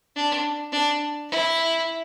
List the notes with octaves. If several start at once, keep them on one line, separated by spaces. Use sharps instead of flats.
D4
D4
E4